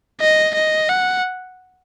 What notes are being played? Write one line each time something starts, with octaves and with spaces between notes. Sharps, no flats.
D#5
D#5
F#5